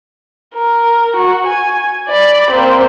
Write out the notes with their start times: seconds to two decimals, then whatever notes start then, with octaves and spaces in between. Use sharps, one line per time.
0.55 A#4
1.16 F#4
1.46 G#5
2.08 D5 B5
2.51 A#3 C4